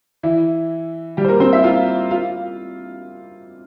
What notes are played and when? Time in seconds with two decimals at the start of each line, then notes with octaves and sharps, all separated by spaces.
0.23 E3 E4
1.17 G3 G4
1.25 C5
1.28 A#3 A#4
1.40 C4 C5
1.53 E4 E5
1.64 F4 F5
2.11 F4 F5